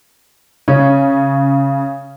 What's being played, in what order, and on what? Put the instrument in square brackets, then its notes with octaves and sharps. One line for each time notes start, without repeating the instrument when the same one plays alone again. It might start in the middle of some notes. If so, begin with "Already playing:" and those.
[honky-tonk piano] C#3 [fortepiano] C#4